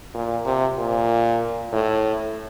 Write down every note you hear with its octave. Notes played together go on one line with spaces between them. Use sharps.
A#2
C3
A#2
A2